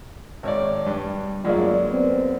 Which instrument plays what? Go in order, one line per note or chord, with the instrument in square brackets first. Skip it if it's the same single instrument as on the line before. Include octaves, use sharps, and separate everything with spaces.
[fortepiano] G#1 C#5 D5
G2
[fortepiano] F#2 G#3 A#3 [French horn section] D3 F4 D5
[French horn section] B3 C4